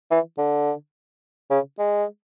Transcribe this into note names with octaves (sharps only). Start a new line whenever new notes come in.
E3
D3
C#3
G#3